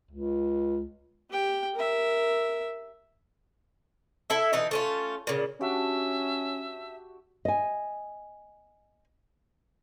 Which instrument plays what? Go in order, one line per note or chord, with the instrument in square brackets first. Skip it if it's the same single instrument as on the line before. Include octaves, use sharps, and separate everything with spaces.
[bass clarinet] C#2
[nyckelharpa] G4 G5
A#4 E5
[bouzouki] E4 A4 E5
B2 E3 D#4
A3 C#4 F4
A#2 C#3
[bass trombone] C#4 [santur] D4 F#4 G4 [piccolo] E5
[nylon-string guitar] D#5 G#5